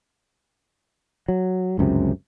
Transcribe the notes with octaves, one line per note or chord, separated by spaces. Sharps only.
F#3
G1 C#2 F#2 C3